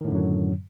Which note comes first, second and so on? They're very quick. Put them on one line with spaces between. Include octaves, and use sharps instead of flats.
D#3 A2 D3 F#2 F#3